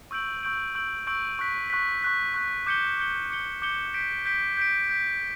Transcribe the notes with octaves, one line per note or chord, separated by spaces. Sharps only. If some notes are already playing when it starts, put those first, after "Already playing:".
C#6 E6 G6 D7 F#7
C#6 E6 G6 D7 F#7
C#6 E6 G6 D7 F#7
C#6 E6 G6 D7 F#7
C#6 F#6 B6
C#6 F#6 B6
C#6 F#6 B6
C#6 F#6 B6
D6 G6 C#7 G7
D6 G6 C#7 G7
D6 G6 C#7 G7
D6 G6 C#7 G7
G6 B6 D7
G6 B6 D7
G6 B6 D7
G6 B6 D7